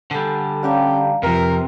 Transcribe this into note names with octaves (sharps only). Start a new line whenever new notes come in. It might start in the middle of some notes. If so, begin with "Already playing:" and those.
D3 G3 A4 F#5 G#5
C#4 G4 A4 D5 F5 F#5 A#5
F2 C3 F3 A#4 B4